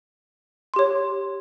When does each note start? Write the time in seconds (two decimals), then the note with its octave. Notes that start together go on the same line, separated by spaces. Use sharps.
0.74 C6
0.76 G4
0.79 C#5